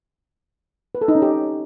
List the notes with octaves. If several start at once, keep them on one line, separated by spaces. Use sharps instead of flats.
B4
A4
D#4
C#4
G4